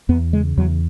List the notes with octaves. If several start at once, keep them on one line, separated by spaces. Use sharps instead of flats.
E2 B3
C#3 G#3
E2 F#3